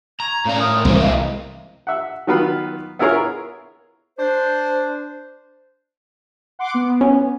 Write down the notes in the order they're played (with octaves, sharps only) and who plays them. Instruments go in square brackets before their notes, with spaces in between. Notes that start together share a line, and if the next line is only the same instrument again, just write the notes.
[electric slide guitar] A#5 [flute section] C#6 G#6
[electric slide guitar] A2 A#5 [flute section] C#4 D5 F5
[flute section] A#4 C#5 D#6
[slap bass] C2 E3 [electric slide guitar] G#3 A#3 E4 [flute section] C5
[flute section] D#5 F5 A#5
[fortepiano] E5 F#5
D#3 F#3 B3 F4 B4
B3 E4 F4 G#4 A#4 C#5
[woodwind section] D4 C5
[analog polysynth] F#5 C6 D6
B3
[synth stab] C#4